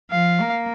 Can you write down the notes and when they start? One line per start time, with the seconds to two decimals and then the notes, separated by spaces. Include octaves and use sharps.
0.10 F3 F5
0.41 A#3